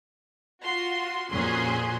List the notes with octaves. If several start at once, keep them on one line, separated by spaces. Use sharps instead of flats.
F4 F#4 C6
F2 A#2 C#4 F#4 G#4 C6